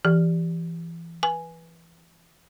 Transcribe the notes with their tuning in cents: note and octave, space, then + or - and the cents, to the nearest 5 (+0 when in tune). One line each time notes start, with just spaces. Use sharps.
E3 +25 G4 +0
B4 -15 G#5 +0